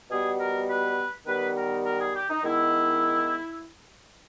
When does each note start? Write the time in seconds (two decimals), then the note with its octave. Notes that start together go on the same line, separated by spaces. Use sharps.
0.10 B2 G3 B3 G#4
0.39 A#4
0.68 B4
1.26 D#3 G3 B3 B4
1.56 A#4
1.85 A#4
2.00 G#4
2.15 G4
2.29 D#4
2.43 D#3 G#3 B3 E4